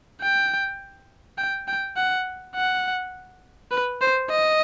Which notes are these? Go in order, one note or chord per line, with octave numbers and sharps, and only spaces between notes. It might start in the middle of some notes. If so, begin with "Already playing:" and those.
G5
G5
G5
F#5
F#5
B4
C5
D#5